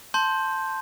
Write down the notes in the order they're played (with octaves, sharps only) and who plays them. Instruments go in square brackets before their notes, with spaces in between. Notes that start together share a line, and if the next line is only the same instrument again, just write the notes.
[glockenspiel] A5 C6 G6